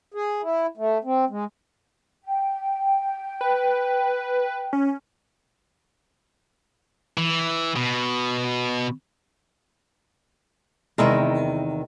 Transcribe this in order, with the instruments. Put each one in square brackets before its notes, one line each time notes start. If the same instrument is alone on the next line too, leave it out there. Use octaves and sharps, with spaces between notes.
[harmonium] G#4
E4
A3
C4
G#3
[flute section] G5
[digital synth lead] B4
C#4
[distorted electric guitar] E3
B2
[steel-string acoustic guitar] E2 C3 D#3 [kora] G#3 E4 A#4